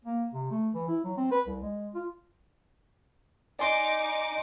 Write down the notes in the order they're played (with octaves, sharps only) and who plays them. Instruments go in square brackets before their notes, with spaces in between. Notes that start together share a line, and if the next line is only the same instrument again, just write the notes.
[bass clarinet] A#3
C3
A3
E3
E4
F#3
C4
B4
C2
G#3
F4
[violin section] D#4 D6 [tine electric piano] D5 G#5 C6